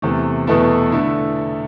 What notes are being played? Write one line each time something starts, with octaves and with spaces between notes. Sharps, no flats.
E2 C3 E3 A3
E2 B2 A3 E4 A4
D3 A3 E4